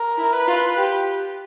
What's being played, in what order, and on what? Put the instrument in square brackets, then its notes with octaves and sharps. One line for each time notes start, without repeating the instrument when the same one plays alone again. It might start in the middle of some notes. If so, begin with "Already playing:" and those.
Already playing: [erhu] A#4
[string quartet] E4
[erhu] B4
[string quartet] F4
G4